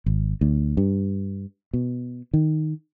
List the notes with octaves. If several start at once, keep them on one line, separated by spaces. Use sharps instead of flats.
G#1
D2
G2
B2
D#3